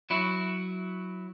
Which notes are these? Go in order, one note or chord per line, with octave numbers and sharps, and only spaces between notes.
F#3 E4 F#4